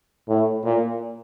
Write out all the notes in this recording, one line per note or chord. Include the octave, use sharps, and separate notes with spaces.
A2
A#2